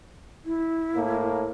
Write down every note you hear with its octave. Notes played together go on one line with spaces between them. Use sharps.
E4
A2 A#3